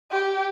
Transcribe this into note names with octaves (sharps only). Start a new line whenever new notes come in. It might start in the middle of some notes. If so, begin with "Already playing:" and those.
G4